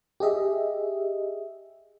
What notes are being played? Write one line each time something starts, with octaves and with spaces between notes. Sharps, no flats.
G4 G#4 D#5 E5